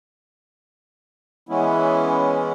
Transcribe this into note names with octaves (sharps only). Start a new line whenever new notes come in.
E3 G#3 B3 C#4 E4